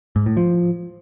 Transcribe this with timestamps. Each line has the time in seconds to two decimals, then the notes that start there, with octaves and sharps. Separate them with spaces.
0.16 G#2
0.26 A2
0.37 F3